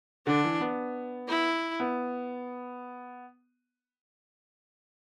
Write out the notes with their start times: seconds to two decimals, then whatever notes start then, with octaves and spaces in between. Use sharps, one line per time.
0.27 D3 D4
0.44 E3
0.61 B3
1.29 E4
1.80 B3